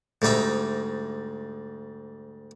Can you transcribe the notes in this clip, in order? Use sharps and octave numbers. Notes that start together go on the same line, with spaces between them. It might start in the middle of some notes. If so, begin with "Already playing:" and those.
D2 G#2 G3 D#4 E5 A#5